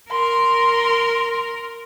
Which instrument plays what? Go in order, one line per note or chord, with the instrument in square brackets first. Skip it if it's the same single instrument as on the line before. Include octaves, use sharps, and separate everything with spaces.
[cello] A#4 [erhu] C6